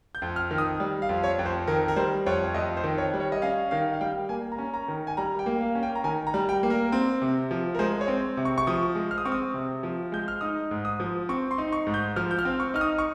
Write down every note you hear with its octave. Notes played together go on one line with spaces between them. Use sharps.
G6
F2
F6
D#3
D#6
G3
F5
F2
C#5
F2
C5
D#3 A#4
A#4
G3 C5
F2 C#5
F2 D#5
C5
D#3
C#5
G3
C#5
D#5
C#4 F5
D#3 F5
F5
G3 G5
A#3 G#5
A#5
C#4
A#5
D#3
G#5
G3 A#5
G5
A#3
F5
C#4
G5
A#5
D#3 G#5
A#5
G3
G5
A#3
A#4
C4
C3
F3
A#4
G#3 C5
C#5
C4
C3
C#6
C#6
F3 D#6
G#3
F6
D#6
C4 C#6
D#6
C3
F3
G#3 G6
F6
D#4 D#6
G#2
D#6
F3
C4 C#6
C6
D#4
C#6
G#2
G6
F3 F6
G6
F6
C4
C#6
D#4 F6
D#6
C#6